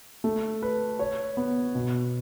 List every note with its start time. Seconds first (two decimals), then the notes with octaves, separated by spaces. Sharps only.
0.24 A3
0.62 B4
0.99 C#5
1.37 B3
1.75 B2